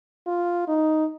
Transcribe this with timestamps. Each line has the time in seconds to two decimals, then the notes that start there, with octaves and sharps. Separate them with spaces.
0.27 F4
0.68 D#4